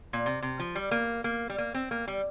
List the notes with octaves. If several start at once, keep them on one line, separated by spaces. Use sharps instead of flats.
A#2
C3
C3
F3
G3
A#3
A#3
G3
A#3
C4
A#3
G3